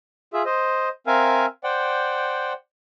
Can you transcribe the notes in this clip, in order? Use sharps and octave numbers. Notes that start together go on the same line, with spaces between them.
F4 G#4 E5
C5 D#5
C4 A#4 E5 F5 G#5
C5 D5 F#5 G5